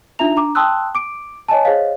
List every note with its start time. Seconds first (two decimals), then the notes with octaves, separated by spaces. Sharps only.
0.19 D4 D#4 F4 E5 A#5 F7
0.36 D4 A#5 D6
0.55 G5 A5 C6 D#6 E6 F#6
0.95 D6 D7
1.48 C#5 D#5 G#5 A5
1.65 G#4 C5 C#5 D#5 F5